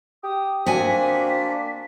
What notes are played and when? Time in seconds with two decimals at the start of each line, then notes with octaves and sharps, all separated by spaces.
0.24 G4 D#6
0.66 A#3 C4 D4 F#4 G#5 B6